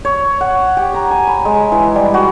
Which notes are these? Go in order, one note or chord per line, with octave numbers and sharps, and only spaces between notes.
C#5
F#5
G4
A#5
G#5
B5
G#3
E3
G3
F#4